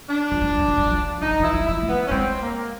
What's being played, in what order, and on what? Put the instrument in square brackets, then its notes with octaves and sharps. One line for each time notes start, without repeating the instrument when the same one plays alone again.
[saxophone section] D4
[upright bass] F3
F#3
F3
F#3
F3
F#3
F3
[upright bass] E3 [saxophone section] D#4
[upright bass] F3
E3
[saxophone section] E4
[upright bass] F3
F#3
[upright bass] F3 [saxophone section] E4
[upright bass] A3
[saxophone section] B3
C#4
[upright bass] G#3 [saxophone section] C4
[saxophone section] A#3